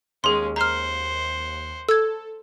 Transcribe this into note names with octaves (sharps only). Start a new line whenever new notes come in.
D#2 G#3 C#4 G#4 C6
C5 F#5 A#5 F6
A4 E6 G#6